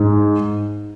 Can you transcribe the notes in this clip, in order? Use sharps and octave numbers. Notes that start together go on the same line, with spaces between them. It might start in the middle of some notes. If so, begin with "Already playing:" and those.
Already playing: G#2